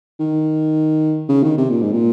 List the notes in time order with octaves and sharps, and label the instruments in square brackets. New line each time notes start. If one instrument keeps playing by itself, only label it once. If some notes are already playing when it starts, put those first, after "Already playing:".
[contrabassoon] D#3
C#3
D#3
C3
A#2
G#2
A#2